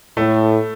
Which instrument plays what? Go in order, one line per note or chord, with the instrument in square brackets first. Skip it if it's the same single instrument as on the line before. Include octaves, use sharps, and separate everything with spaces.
[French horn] A2 [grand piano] A3